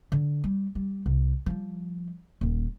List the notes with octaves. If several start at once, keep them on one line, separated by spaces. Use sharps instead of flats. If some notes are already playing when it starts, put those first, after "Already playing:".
D3
G3
G3
C2
F3 G3
D#1 D#3